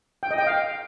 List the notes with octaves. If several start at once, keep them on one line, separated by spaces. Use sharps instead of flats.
G5
D#5
G5
F5